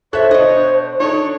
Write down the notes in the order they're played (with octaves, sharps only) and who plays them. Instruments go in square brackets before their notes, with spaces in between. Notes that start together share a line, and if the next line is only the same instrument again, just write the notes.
[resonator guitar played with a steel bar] A4 E5 [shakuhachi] C5 [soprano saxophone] C#5 [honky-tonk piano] F#6
[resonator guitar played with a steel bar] B2 D#5 [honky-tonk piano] D4
[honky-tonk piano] D4 D#4 A4 [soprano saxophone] C#5